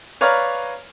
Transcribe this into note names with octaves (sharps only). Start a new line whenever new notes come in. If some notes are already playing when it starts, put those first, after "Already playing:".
B4 C#5 D5 F5 A#5 F6